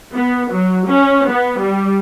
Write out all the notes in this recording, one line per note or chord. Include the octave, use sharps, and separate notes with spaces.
B3
F#3
C#4
B3
G3